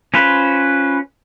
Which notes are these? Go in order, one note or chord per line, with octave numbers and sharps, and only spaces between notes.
C#4 F4 B4 C5